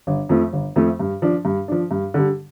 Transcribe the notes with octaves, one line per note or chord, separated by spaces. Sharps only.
G1
F2 F3 A3
G1
F2 F3 A3
G2
F3 D4
G2
F3 D4
G2
D3 G3